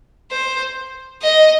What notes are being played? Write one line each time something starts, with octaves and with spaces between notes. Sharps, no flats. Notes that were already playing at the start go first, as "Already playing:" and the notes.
C5
D#5